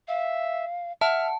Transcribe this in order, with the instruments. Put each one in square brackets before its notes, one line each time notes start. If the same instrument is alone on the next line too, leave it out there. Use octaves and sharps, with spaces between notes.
[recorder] E5 [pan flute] F5
[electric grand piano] E5 [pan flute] F#5 [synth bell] A5 [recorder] F6